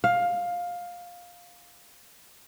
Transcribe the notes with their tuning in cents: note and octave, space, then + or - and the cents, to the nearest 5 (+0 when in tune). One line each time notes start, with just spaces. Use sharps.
F5 +15